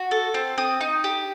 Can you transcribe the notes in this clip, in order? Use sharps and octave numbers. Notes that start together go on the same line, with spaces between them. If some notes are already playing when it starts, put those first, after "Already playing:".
Already playing: F#4
A4
C4
C4 D#6
D#4
G4